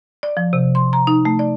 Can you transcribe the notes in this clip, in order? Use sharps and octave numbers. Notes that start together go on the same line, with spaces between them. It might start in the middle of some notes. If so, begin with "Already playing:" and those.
D5
F3
C3
C6
A#5
D#4
A3
D5